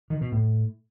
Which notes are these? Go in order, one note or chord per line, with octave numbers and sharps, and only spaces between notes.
D#3
B2
A2